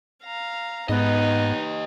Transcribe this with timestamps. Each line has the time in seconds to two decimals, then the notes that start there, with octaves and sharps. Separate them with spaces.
0.24 F5 A#5
0.89 G#2 B3 D#4 G4 B4 D#5